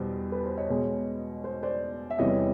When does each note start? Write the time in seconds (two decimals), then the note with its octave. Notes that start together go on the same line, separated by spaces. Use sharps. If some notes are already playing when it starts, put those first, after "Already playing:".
Already playing: E2 B2 G3 C5
0.32 B4
0.45 C5
0.57 C#5 D#5
0.69 B2 G#3
1.44 C5
1.63 C5 D5
2.10 E5
2.19 E2 C3 E3 G3 C#5 D#5